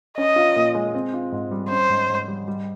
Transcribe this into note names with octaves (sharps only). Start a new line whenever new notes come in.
C#4 D#5
F4
A#2
G#3
C4
F4
G#2
G3
C#4 C5
G#2
G#2
G3
G3